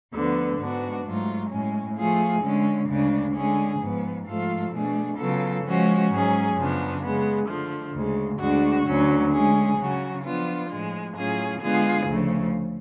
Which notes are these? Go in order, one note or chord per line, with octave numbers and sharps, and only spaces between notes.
D2 D3 F3 B3
G#2 G#3 B3 D4 F#4
G#2 F#3 A3 F4
A2 G#3 C#4
F3 A3 F4 G#4
D3 G#3 C#4
D2 C#3 G#3 D4
D3 G#3 C#4 G#4
G#2 F3 B3
G#2 F3 A3 F4 A4
B2 A3 D4 G#4
C#3 F#3 B3 F4 A4
F3 G#3 C#4 F#4
G#2 F#3 C#4 G#4
F#2 C#3 F3 B3 D4
C#3 G#3 B3
D3 F3 A3
D2 C#3 G#3
D2 D3 G#3 D4 F#4
D2 D3 F#3 C#4
D3 G#3 C#4 G#4
C#3 F#3 C#4 F#4
F3 B3 D4 F4
A2 F3 G#3
A2 F#3 C#4 F4 G#4
D3 G#3 B3 F4 G#4
D2 C#3 F3 A3